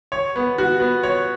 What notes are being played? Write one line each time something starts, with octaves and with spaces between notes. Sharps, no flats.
C#5
B3
F#4
B3
C#5